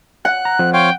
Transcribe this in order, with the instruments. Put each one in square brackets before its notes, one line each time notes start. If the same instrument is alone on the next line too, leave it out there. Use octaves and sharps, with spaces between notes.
[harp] F#5 [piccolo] F#6
[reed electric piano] A#5
F3 C4
[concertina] C5 C#5 F5 [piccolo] G5